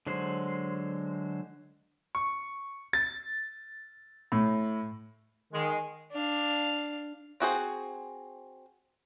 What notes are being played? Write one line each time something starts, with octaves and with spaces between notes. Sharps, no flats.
D3 F#3 G#3 C5
C#6
A6
A2
D#3 G#3
D4 F5
C4 F#4 G#4 C5